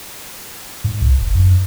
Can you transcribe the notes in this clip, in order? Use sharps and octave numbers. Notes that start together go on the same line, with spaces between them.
G#2
C2
G1
F#2